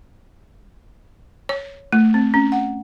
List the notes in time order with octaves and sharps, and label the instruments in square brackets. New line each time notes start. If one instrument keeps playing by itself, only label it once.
[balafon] C#5
A3
C4
C#4
F#5